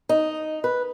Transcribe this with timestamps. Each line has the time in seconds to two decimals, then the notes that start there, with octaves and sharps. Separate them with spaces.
0.09 D#4
0.64 B4